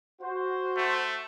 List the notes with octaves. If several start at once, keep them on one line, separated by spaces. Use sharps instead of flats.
F#4 C5
A3